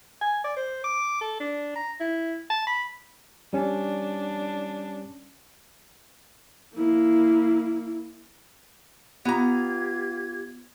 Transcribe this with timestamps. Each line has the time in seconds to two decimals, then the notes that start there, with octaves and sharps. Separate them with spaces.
0.21 G#5
0.45 D5
0.57 C5
0.84 D6
1.21 A4
1.40 D4
1.76 A#5
2.00 E4
2.50 A5
2.67 B5
3.53 G3 C#4 D4
6.75 A#3 E4
9.25 B3 F4 G4 A#5 G#6